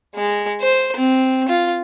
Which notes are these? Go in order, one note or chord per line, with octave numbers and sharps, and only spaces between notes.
G#3
C5
C4
F4